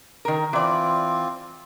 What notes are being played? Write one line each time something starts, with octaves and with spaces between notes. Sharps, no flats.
D#3 A#4
E3 C4 F4 D5